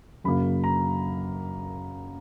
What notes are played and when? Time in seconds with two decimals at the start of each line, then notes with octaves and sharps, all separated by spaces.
0.24 F#2 C#3 F#3 A#3 B5
0.64 A#5